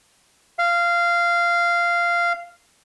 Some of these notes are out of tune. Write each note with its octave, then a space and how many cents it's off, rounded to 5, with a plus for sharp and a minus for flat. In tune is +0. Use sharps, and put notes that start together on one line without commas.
F5 -15